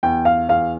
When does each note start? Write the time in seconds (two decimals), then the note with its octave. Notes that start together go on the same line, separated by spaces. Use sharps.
0.03 E2 G5
0.25 F5
0.49 E2 F5